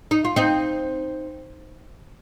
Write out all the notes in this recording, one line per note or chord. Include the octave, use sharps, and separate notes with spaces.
D#4
F4
C4 D#4